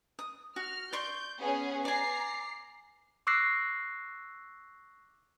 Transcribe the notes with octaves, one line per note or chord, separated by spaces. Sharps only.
D#6
F#4 F6
D5 C6 C#6 G6
B3 C#4 G#4
D5 G#5 A#5 C7
C#6 D6 E6 F#6 A#6 C7